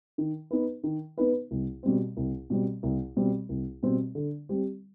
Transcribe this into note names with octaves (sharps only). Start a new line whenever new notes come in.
D#3
B3 D#4 B4
D#3
B3 D#4 B4
C2
B2 G3 C4
C2
B2 G3 C4
C2
B2 G3 C4
C2
B2 G3 C4
D3
G3 C4 G4